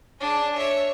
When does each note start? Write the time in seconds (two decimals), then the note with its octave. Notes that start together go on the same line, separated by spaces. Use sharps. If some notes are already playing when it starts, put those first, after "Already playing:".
0.20 D4 G#4
0.55 C#5 E5